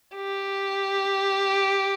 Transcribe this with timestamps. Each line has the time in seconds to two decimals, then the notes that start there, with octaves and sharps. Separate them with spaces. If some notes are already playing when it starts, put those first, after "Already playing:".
0.16 G4